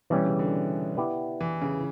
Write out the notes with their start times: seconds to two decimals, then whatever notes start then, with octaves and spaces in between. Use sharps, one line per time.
0.10 B2 E3 G3 C#4 G4
0.26 C#3
0.39 D3
0.97 B3 E4 G4 B4 D5
1.41 E3
1.62 C#3